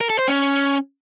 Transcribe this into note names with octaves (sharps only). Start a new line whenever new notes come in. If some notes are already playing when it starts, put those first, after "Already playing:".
A#4
A4
C5
C#4